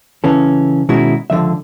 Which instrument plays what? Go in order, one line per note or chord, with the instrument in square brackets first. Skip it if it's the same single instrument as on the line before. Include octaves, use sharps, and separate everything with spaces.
[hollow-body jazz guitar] C#3 E3 C#4 A4
B2 D#3 G#3 C#4 E4 F#4
C#2 D3 F3 E5